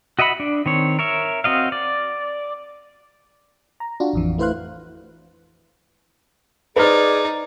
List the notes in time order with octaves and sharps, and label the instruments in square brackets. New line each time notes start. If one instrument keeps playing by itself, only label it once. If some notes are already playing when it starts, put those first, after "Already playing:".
[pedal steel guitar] F#4 D#5 E5 F#5 B5
D4
D#3 C4 C#5
A#4 C#5 E5
C4 F#4 D#5 F5
D5
[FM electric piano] A#5
D4 F4 F#4
A1 F2 E3
A3 E4 B4 C5 F5 F#6
[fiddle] D#4 [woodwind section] G#4 D5 [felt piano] B4 C5 F6